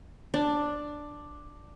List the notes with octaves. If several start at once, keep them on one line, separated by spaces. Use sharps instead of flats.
D4